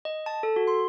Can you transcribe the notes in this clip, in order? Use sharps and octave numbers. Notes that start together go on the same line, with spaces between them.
D#5
A5
A4
F#4
C6